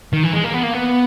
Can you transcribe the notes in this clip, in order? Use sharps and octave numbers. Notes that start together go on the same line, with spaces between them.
D#3
E3
G#3
A#3
B3
A#3
B3